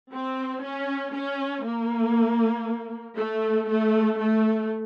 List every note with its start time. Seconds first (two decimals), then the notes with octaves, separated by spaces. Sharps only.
0.12 C4
0.63 C#4
1.14 C#4
1.65 A#3
3.18 A3
3.68 A3
4.19 A3